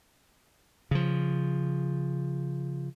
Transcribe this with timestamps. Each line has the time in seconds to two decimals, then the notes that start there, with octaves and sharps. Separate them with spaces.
0.91 C#3 F3